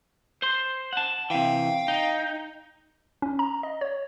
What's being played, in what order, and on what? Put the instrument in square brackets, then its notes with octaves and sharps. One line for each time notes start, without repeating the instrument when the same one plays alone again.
[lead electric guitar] C5 C6
F#5 A5
[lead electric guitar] C3 E3 [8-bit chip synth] F5 G5
[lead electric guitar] D#4
[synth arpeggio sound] C#4
A#5
D#5
C#5